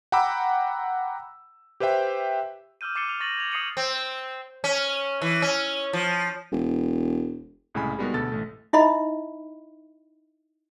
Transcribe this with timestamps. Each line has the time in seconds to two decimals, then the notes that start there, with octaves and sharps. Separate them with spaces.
0.12 F#5 G5 A#5 B5 D6 E6
1.80 G4 B4 C5 E5 G5
2.81 D6 E6 F6 G6 D#7
2.95 D6 A6 C7 C#7 D#7 G7
3.08 F6 F7
3.20 C#6 A6 A#6 D#7 F#7
3.38 G#6 F7
3.52 D6 D#6 C7 C#7 D#7 F#7
3.77 C4
4.64 C#4
5.22 E3
5.42 C#4
5.93 F3
6.52 E1
7.74 C2 A2 C#3 G#3 G#5 B5
7.99 G3 G#3 B3 D#4 F#4 A#4
8.14 D2 B2 A4 A6
8.32 A1 A3
8.73 D#4 E4 D#5 E5 B5